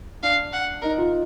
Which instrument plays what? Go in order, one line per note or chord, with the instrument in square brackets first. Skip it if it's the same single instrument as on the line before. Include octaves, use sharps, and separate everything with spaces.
[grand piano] D4 [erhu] F5
[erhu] F#5
[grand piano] D#4 [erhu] A#4
[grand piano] F4